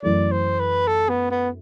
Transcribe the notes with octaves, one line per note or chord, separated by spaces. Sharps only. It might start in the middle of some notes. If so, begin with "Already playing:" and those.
F#2 E3 A3 D5
C5
B4
A4
B3
B3